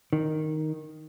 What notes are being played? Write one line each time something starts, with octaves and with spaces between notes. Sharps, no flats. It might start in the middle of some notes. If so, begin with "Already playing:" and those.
D#3